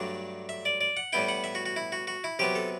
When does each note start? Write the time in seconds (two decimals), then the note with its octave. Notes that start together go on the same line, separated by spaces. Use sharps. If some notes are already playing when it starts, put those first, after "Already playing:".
Already playing: G2 F#3 A3 D4
0.49 E5
0.65 D5
0.81 D5
0.97 F#5
1.13 A2 G3 B3 E4 G5
1.28 F#5
1.44 E5
1.55 F#4
1.66 F#4
1.76 E4
1.92 F#4
2.07 F#4
2.24 E4
2.39 C3 F#3 B3 G4
2.55 A4